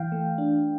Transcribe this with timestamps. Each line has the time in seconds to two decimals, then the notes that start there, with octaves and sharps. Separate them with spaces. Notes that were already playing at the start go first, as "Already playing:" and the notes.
Already playing: E3 F5 G5
0.12 A3
0.38 D4